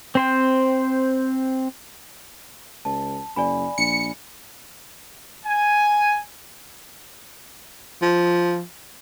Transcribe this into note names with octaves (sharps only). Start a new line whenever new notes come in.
C4 C5 G5
C#2 A5
F#1 D5 G#5 B5
A#1 C#7
G#5
F3